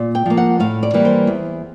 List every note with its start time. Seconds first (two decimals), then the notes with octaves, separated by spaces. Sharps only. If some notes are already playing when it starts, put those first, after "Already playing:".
Already playing: A#2
0.15 G5
0.26 F3 A#3
0.37 F#5
0.60 A2 F5
0.83 D5
0.94 E3 G3 A#3
1.05 C5
1.27 E2